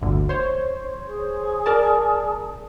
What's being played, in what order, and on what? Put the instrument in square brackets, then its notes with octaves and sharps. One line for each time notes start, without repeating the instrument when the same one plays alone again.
[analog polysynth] G1 D2
C5 C#5
[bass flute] G#4
[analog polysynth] A#4 D5 A5